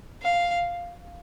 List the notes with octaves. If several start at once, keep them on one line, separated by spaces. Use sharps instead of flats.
F5